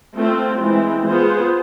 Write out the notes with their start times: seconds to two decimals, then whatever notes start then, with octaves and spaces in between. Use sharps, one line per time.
0.17 A3 C4 F4
0.61 E3 G#3 C4
1.05 B3 F4 G#4 C5